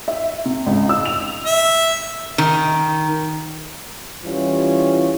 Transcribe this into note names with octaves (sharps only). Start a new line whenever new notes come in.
E5
C3
C#2
E6
F7
E5
D#3
E3 G3 C#4 F4